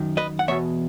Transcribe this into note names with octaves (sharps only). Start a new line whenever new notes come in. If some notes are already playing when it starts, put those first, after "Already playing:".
Already playing: F#2 D#3
B4 D#5
F#5
E2 B2 C#5 E5